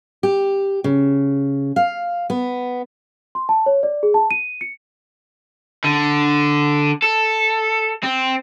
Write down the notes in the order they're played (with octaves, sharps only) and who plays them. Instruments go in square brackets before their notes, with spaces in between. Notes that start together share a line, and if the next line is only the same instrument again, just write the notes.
[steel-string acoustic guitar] G4
C#3
F5
B3
[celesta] C6
A5
C#5
D5
G#4
A5
D#7
C#7
[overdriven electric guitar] D3
A4
C4